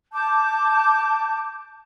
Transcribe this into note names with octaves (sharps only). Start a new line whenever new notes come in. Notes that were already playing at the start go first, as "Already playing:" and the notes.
A5 D6 G6